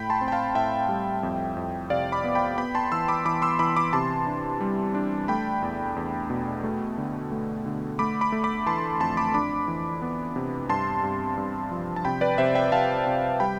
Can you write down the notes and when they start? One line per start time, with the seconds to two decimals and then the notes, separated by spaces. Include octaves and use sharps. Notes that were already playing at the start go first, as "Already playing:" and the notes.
Already playing: A2 G5 B5
0.10 A5 C6
0.21 C4
0.28 G5
0.32 F5 A5
0.55 A2 E5 G5
0.89 G3
1.23 F2
1.57 F2
1.90 C3 D5 F5
2.12 B5 D6
2.24 B3
2.35 G5 B5
2.58 B3 G5 B5
2.75 A5 C6
2.92 E3 C6 E6
3.08 B5 D6
3.25 E3 B5 D6
3.42 C6 E6
3.59 E3 B5 D6
3.76 B5 D6
3.93 C3 A5 C6
4.27 D4
4.61 G3
4.95 D4
5.28 A3 G5 B5
5.62 E2
5.96 E2
6.30 B2
6.63 A3
6.98 D3
7.31 A3
7.66 D3
7.99 A3 B5 D6
8.21 B5 D6
8.32 A3
8.44 B5 D6
8.67 E3 A5 C6
9.00 F2 A5 C6
9.17 B5 D6
9.34 D4 B5 D6
9.68 E3
10.02 B3
10.36 C3
10.69 G2 A5 C6
11.03 G2
11.37 G2
11.72 F3
11.96 A5
12.05 C3 G5 B5
12.21 B4 D5
12.38 C3 C5 E5
12.55 E5 G5
12.72 C3 F5 A5
13.06 C3
13.40 G3 G5 B5